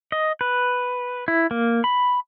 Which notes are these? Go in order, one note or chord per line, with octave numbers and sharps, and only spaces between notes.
D#5
B4
E4
A#3
B5